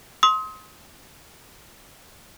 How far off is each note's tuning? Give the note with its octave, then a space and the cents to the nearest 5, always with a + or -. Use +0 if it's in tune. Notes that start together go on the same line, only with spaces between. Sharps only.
C6 +10 D#6 +35